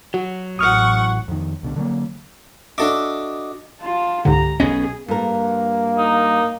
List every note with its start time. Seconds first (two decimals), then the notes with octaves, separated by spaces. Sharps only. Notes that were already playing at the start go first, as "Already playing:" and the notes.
0.14 F#3 F#4
0.59 A1 F#5 C#6 D#6 F6
1.28 F2 D#3
1.63 C2 B2 D3
1.76 D3 F#3 A3 A#3
2.78 D4 F#4 A4 D#5 E5 D6
3.81 F4 A5
4.25 C#2 G#2 D3 G4 A#5
4.60 B1 B3 C#4 G#4 D#5
5.08 G2 A#3 A#4
5.98 D#4